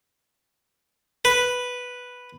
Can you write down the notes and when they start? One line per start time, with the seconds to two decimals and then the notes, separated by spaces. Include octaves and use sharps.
1.25 B4